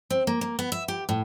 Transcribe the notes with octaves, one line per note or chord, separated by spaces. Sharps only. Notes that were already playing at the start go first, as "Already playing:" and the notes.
C4
A#3
A#3
B3
E5
G4
A2